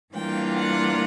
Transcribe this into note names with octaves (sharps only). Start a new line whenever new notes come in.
E3 G3 A#3 D4 F4 G5
F#5